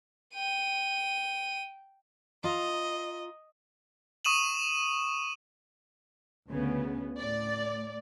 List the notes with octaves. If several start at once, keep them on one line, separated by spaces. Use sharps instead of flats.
G5 D#7
F4 D#5 A#5
C#6 D#6 D#7 E7 F#7
D2 C#3 B3
A2 D5